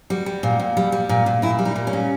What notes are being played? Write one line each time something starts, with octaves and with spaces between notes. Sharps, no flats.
G3 F#4
G3
A#2
A#2
G3
G3
A#2
A#2
A#2 E4
G3
D#4
A#2
C#4
A#2